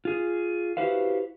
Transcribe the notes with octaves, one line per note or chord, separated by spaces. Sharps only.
F4 G#4
E4 F#4 G4 B4 C5 F5